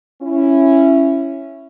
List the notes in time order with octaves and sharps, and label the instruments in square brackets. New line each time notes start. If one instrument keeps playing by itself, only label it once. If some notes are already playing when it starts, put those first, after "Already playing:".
[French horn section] C#4 E4